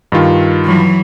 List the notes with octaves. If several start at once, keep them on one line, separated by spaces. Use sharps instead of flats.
G2 D#3 F4
E3 F#3